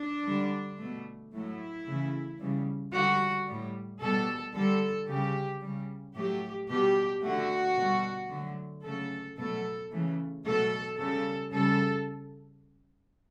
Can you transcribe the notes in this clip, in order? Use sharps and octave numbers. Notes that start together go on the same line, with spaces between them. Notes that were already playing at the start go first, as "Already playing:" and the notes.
Already playing: D4
D3 G3
B2 A3
A2 F#3 A3 E4
C#3 E3 A3
C#3 E3 G3
D3 G3 F#4
A2 G3
B2 G3 A4
D3 G3 A4
C#3 G3 G4
C#3 G3
A2 F#3 A3 G4
B2 G3 G4
D3 A3 F#4
B2 G3
D3 F#3 A3
C#3 F#3 A3 A4
B2 F#3 A3 A4
C#3 E3 A3
B2 F#3 A3 A4
C#3 G3 A4
C#3 G3 A4